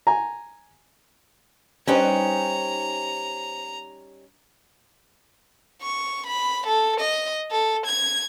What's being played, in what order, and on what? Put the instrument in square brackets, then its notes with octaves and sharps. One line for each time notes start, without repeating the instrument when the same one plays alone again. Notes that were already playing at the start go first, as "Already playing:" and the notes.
[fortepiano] G#5 A#5
[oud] G3 D#4 B4 [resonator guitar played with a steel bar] C#4 [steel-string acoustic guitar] C5 G5 G#5 [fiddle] A#5
[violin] C#6
B5
A4
D#5
A4
G#6